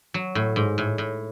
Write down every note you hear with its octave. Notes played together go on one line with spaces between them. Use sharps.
F#3
A2
G#2
A2
A2